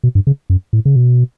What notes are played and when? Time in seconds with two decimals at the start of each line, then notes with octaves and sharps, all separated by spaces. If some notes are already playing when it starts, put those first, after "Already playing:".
0.04 B2
0.15 G2
0.27 C#3
0.50 F#2
0.73 A2
0.85 C#3
0.96 B2